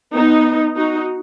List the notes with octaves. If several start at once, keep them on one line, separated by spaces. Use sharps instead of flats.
B3 D#4
D#4 F#4